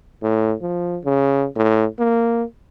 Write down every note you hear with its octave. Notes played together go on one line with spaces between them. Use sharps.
A2
F3
C#3
A2
A#3